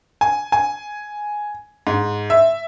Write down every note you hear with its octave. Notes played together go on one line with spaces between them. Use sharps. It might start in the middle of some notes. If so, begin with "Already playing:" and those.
G#5
G#5
G#2
E5